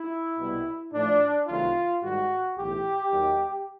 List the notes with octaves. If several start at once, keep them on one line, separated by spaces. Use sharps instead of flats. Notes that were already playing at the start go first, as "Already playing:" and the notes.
Already playing: E4
C2 B2 G3 B3
A2 F3 A3 D4
C2 C3 D#3 F#3 A3 F4
G#2 D#3 G3 A#3 F#4
B1 A2 E3 G4
D#2 D#3 F#3